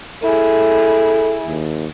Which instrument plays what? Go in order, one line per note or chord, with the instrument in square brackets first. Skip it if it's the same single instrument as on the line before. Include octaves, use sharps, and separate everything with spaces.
[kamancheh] E4 G#4 [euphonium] A4
[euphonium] D#2